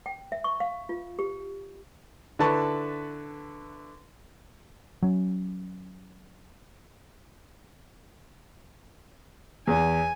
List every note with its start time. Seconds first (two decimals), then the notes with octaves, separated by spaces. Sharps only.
0.06 G5
0.32 E5
0.44 C#6
0.60 F5
0.89 F4
1.19 G4
2.39 D3 E4 B4 A5 C#6
5.02 F#3 C#4
9.67 E2 G#5